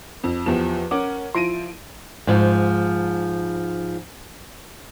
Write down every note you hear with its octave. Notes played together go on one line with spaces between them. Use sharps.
F2
E2 F3 G4 E7
C#4 A#4 F#5 D6
F3 E4 C6 A#6 D7 D#7
G#2 F3